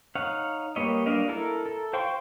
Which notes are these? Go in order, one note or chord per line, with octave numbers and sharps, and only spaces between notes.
D#4 C#5 F5 F#5
G3 A#3 B4 C#5 D#5
G3 A#3 D4 D#5 F5
E4 A4 A#4
A4
C5 F5 G5 C6 C#6